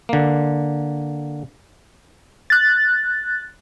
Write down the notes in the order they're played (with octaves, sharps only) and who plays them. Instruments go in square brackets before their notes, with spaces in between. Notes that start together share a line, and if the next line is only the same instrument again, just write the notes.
[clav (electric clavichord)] D3 A#3
[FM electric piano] F#6 A6